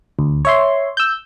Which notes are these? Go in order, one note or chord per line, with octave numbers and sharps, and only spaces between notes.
D2
C#5 E5 C6
E6 G6